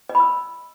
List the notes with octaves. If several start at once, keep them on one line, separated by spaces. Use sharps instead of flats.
D#5
B5
E6